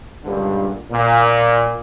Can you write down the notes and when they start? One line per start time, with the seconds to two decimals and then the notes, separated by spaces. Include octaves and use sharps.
0.24 C#2 G2 A#2 D3 G3
0.91 A#2